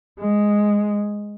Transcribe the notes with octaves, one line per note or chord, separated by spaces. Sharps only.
G#3